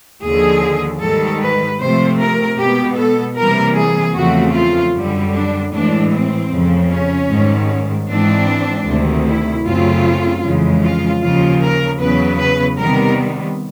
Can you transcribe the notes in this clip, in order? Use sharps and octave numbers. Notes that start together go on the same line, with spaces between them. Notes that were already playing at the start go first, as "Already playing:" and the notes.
D#2 D3 F3 G#4
G#2 D#3 G3 A4
B4
C3 F3 A3 C5
A#4
B2 G#3 B3 G4
A4
C3 E3 G3 A#3 A#4
G#4
E2 C#3 F3 A3 C4 F#4
F4
F#2 D3 G3
D4
A2 E3 G#3 D4
C4
F2 C#3 F3
C#4
G#2 D#3 G3
G#2 E3 G#3 C4 D4
D2 C3 D#3
E4
F#2 C#3 F#3 A3 C4 F4
F2 C#3 E3 G#3
F4
D#2 C#3 F3 F4
A#4
E2 C#3 F#3 B3 B4
B4
C3 D#3 G3 B3 A#4